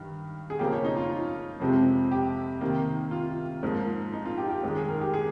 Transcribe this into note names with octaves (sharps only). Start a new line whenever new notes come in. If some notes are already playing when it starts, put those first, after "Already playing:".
Already playing: G2 D#3
G#4
C#3 F3 A#3 G4
C#5
D#4
F4
F2 C3 F3 G#3 C4
G4
C3 D#3 A#3
F4
G#2 F3 A#3
D#4
F4
G4
G4
G#2 D#3 G#3
G#4
A#4
G4
G#4